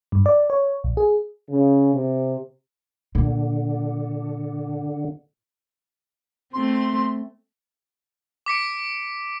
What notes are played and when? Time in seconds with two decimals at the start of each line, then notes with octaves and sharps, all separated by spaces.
0.12 G2
0.26 D5
0.50 C#5
0.84 A#1
0.97 G#4
1.49 C#3
1.94 C3
3.15 A#2 D3
6.53 A3 C4 C6
8.46 D6 B6 C#7 D7